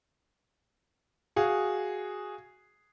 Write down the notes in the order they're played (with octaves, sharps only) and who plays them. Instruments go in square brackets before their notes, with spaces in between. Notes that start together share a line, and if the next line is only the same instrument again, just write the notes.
[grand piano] F#4 G#4 F5